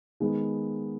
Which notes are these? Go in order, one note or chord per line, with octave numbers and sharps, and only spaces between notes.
D#3 G#3 B3